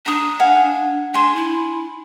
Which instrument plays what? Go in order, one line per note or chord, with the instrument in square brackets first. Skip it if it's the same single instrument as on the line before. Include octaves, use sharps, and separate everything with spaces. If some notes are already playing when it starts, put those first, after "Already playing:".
[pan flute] D4 [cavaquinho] A#5 D#6
[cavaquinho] F5 F#5 G#5
[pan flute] D4 [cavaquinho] G#5 C6
[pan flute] E4